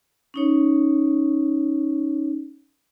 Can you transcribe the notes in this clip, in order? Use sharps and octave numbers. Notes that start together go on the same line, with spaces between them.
C#4 D#4 C#5